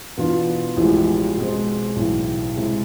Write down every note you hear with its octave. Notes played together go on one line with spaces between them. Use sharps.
E2 B2 B3 D4 F4
A1 A2 F3 G#3
B2 G#3 C4
B1 A2 E3
C3 G#3 C4 E4